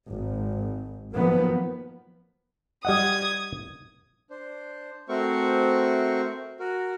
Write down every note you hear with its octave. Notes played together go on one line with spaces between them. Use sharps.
G#1
D#3 F3 F#3 A#3 B3
G3 D#5 F#5 D#6 G#6
D4 C5
A3 C4 F#4 A#4 C5 C#6
F#4 A#4